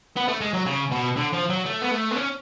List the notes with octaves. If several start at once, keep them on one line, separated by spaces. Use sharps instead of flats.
B3
A3
G#3
F#3
C#3
B2
D3
F3
F#3
A3
B3
A3
B3
C#4